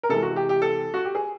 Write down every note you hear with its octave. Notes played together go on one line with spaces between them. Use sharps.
A#4
C3 E3 G#3 A4
F#4
G4
G4
A4
F#4
G4
G#4